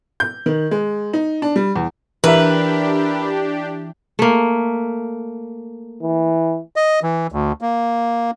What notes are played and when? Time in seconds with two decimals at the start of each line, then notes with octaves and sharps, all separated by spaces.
0.20 G6
0.46 D#3
0.71 G#3
1.13 D#4
1.42 D4
1.56 G3
1.76 E2
2.24 E3 D4 G4 A#4 B4 E5
4.19 A3 A#3
6.03 E3
6.76 D#5
7.03 E3
7.32 D2
7.61 A#3